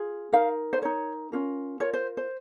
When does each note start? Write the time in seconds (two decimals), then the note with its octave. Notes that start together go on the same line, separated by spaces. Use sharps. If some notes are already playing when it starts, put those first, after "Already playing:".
Already playing: F4 G#4
0.32 D#4 A#4 F5
0.73 C5
0.82 D#4 A#4 C#5
1.32 C#4 F4 A#4
1.80 F4 A#4 C#5
1.93 C5
2.17 C5